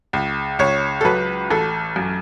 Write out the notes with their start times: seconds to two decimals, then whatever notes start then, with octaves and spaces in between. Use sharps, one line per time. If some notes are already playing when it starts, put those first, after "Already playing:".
0.13 C#2
0.59 C#2 C#5
1.01 A4
1.05 F#3 B4
1.51 A1 A4
1.96 F#2